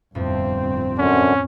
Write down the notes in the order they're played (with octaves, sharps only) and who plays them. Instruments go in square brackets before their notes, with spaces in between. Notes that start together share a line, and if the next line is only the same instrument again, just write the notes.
[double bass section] G1 C4 [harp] F2 A2
[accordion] F#2 D3 [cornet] C#4